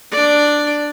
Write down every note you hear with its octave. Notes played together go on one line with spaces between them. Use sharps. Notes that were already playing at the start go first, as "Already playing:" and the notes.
D4 D5